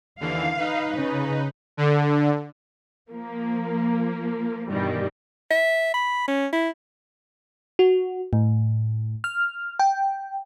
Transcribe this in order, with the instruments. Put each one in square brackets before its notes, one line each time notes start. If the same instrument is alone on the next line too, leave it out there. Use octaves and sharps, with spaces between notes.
[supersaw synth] D#2 D3 E3 [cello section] F5
[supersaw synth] D#4 B4
[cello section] C#3
[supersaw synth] D3
[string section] F3 A#3
G2 B2 D#3 E3 G3
[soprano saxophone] E5
B5
C#4
E4
[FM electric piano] F#4
A2
F6
G5